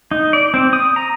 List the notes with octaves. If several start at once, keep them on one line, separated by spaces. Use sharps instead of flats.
D#4
D5
C4
D#6
A#5